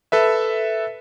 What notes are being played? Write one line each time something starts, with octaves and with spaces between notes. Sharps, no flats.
A4 B4 E5